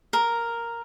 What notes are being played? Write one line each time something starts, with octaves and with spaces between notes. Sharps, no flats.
A#4